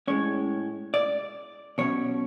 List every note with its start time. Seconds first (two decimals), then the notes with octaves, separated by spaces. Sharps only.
0.08 A2 G#3 C#4 C#5
0.94 D5
1.78 B2 F#3 C#4 C#5